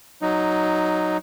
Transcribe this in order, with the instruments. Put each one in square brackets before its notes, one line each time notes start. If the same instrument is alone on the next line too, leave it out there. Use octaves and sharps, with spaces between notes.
[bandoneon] F#3 D#4